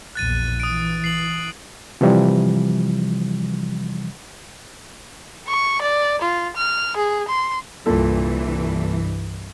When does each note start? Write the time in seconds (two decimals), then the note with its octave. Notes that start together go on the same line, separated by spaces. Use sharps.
0.15 A#1 E2 F#6 A6 D#7
0.60 E3 D#6 D7
1.04 C7 F#7
2.01 C3 E3 F3 G3
5.47 C#6
5.82 D5
6.22 F4
6.56 F6
6.97 G#4
7.28 C6
7.86 C2 G2 A#2 E3 A4